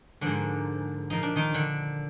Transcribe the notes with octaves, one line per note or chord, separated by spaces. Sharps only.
G#2 D3 F3 A#3 D4
A#2 F3 A#3 D#4
D4
D#3 D#4
D3 D4